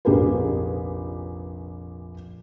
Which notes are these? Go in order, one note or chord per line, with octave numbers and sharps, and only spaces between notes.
F1 A#1 G4 G#4 A#4 B4